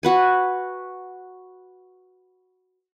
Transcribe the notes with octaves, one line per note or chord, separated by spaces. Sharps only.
F#4 B4 G#5